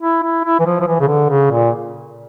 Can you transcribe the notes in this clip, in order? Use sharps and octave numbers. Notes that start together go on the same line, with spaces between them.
E4
E4
E4
E3
F3
F3
E3
C#3
D3
C#3
A#2